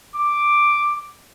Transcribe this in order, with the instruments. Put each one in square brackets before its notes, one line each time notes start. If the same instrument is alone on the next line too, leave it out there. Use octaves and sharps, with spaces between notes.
[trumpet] D6